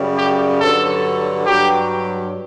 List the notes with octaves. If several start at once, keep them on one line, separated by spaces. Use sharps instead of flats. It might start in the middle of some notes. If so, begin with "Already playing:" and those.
Already playing: F#2 C#3 G3
G4
G2 D3 F#3 A4
G2 F#3 G4